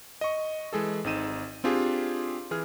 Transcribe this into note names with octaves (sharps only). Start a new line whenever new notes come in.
D#5 C#6
E3 G#3 G#4 A4
G#1 C4 D#4 D#7 E7
C4 D4 F4 G4 G#4
E3 G#4 F6